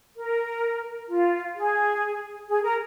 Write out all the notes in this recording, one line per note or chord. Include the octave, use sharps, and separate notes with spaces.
A#4
F4
G#4
G#4
A#4